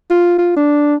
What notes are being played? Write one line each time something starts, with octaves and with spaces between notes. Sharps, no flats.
F4
F4
D4